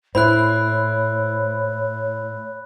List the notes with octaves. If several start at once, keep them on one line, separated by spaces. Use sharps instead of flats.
A2 E4 C5 C#5 B5 F#6